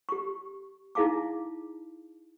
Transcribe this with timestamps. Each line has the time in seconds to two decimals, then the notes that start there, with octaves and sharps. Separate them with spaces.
0.09 G4 C#6
0.95 D#4 E4 G#4 F5 A5 D6